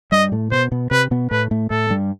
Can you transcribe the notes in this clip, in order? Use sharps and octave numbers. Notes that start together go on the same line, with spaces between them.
G2 G3 D#5
A2 A3
B2 B3 C5
B2 B3
C3 C4 B4
B2 B3
A2 A3 B4
A2 A3
A2 A3 A4
G2 G3